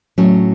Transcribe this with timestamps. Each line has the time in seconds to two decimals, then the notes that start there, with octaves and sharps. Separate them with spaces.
0.18 A2 F#3 C#4